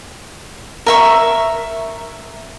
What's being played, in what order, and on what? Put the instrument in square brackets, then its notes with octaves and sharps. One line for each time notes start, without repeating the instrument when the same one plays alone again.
[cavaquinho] A#4 E5 C#6